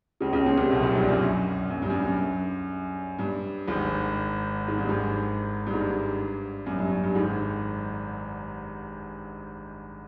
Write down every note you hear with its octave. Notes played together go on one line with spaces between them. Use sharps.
C#2 C#3
C#2 C#3
C#2 C#3
C2 C3
B1 B2
A#1 A#2
G2
F#2
F#2
G2
F#2
G2
F#2
G2
G#1 G#2
G#2
G2
G#1 G#2
G2
G#2
G2
F#2
G2
F#2
G2
G#1 G#2